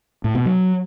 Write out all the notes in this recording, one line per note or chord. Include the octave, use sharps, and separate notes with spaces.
A2
B2
F#3